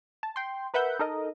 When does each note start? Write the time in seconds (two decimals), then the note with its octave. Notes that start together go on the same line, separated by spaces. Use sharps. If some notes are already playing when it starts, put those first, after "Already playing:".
0.23 A5
0.36 G5 C6
0.74 A#4 B4 E5 F#5 G6
0.99 D#4 A4 A#4 D#5